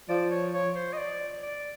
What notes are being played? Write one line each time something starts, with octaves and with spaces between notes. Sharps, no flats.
F3 D5
C#5
C#5
C5
D#5
D5
D5